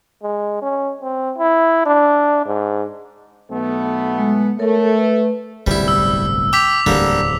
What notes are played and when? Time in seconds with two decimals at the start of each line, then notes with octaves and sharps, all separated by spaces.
0.23 G#3
0.62 C#4
1.02 C4
1.38 E4
1.86 D4
2.46 G#2
3.51 B1 A3 B3
4.18 G#3
4.59 A3 A4 A#4 C#5
4.97 B4
5.67 D1 G1 C2 G3 E4
5.88 E6
6.53 G5 D6 B6 F7
6.86 D1 E2 D3 G3 A#3